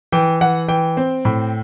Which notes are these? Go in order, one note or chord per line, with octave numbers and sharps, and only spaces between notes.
E3 G5
E3 F#5
E3 G5
C4
A2